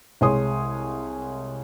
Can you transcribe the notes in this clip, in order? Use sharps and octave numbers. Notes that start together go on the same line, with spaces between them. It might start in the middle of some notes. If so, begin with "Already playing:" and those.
C2 G#3 C#5 G#5 C6 D#6